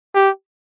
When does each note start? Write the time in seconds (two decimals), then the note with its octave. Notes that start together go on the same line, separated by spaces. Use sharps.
0.15 G4